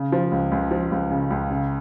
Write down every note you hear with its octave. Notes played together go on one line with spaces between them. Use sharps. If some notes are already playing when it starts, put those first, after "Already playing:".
Already playing: C#3
F3
C#2
C#2
F3
C#2
C#3
C#2
C#3